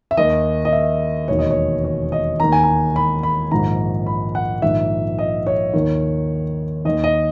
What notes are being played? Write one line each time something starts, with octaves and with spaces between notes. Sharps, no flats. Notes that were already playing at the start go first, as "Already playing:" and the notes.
E5
D#2 D#3 D#5
D#5
E5
E1 D#2 D#3 C#5
D#5
C#5
C#5
D#5
D#2 D#3 A#5
G#5
A#5
B5
B5
A#1 G#2 D#3 A#5
B5
F#5
A#1 G#2 D#3 E5
D#5
C#5
D#2 D#3
D#2 D#3 D#5
D#5